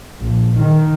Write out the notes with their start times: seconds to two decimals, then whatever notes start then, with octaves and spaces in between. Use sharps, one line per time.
0.22 A#1
0.55 D#3